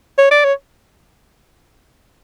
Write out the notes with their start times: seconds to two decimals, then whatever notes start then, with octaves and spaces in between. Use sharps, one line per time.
0.18 C#5
0.31 D5
0.44 C#5